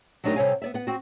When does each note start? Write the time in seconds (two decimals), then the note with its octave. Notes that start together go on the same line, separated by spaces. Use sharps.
0.24 F#3 A3 D4 D#4 G4 A#4
0.36 C3 G3 A4 C#5 F5 G#5
0.62 B3 D5 E5
0.74 B3 F#5
0.87 C4 F#4